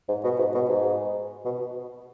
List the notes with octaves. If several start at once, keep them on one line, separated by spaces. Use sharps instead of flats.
G#2
B2
G#2
B2
G#2
B2